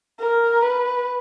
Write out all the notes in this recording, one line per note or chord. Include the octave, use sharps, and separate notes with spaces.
A#4
B4